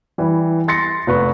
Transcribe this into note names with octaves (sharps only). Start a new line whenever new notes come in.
E3 G3
C6 A6 A#6 C#7
F1 B4 C#6